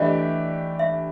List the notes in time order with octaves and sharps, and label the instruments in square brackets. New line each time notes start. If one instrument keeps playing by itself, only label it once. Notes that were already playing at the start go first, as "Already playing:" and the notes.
Already playing: [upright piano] E3 A3 D4 G4 [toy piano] D#5
[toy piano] E5